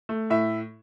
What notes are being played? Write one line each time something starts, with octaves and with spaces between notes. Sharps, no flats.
A3
A2 E5